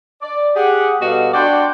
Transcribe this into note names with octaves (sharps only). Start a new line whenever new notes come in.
D5
G4 G#4 F#5
B2 G3 F#4 A4 D#5 F5
D4 F#4 D5 F#5 G5 C6